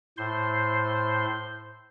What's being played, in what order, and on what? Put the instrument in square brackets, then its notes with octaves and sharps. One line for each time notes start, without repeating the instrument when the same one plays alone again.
[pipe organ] A2 C5 C6